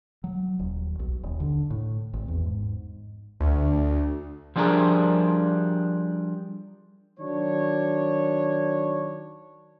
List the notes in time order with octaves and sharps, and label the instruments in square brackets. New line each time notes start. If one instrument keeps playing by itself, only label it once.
[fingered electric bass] F#3
D#1
B1
D#1
D3
A2
G#1
E2
G#2
[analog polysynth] D2
[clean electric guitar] F3 G3 D4 G#4 A#4
[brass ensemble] D#3 F#3 D4 C#5